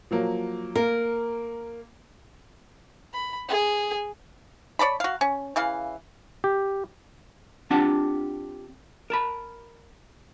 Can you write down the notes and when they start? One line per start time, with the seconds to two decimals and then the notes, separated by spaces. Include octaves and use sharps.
0.11 F3 F#3 A#3
0.76 A#3 A#4
3.13 B5
3.49 G#4
4.79 C#5 D5 A5 B5
5.00 F#4 F5
5.21 C#4
5.56 C#3 E3 F5
6.44 G4
7.71 C4 D4 F4 G4 F#5 A5
9.10 A#4 A5 B5